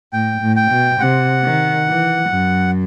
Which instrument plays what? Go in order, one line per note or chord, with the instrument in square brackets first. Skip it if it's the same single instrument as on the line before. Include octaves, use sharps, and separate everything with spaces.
[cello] A2 [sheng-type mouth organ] G5
[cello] A2
[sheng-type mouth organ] G5
[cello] B2
[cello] C3 [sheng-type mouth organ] F#5
[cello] D#3
E3
F#2